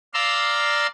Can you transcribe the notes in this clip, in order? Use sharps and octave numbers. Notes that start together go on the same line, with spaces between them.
D5 F5 A#5 C6 E6